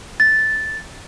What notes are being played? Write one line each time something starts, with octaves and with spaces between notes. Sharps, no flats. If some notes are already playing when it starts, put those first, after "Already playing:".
A6